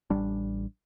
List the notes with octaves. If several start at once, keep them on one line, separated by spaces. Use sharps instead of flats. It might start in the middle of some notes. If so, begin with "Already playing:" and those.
A1 G3 D4